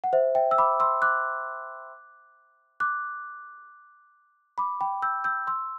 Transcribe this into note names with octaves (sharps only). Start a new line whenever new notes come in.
F#5
C5 E5
E5 G5
E6
B5 D6
C6 E6
D6 F#6
D6 F#6
B5 D6
G5 B5
E6 G6
E6 G6
C6 E6